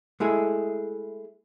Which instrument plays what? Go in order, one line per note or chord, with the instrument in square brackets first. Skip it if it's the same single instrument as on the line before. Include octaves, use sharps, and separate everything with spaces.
[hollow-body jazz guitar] G#3 A3 E4 G#4